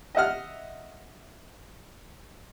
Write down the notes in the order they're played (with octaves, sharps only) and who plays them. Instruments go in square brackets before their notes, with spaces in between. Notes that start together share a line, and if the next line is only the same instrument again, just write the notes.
[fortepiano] D#5 E5 F#5 F6